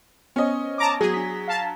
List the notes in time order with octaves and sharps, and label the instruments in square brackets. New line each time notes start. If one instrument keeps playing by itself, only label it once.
[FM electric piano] B3 C5 C#5 [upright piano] C#4 D#5
[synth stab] A5 A#5 D6
[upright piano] F#3 [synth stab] G#4
[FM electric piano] D4 B6
[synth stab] F5 A5